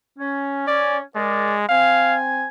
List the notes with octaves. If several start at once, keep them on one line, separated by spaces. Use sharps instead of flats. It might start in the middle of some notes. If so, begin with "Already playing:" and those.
C#4
C#4 D5
G#3 G#4 A#4 D5
C4 F5 G#5